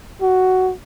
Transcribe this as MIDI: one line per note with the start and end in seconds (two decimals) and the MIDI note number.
0.21 0.72 66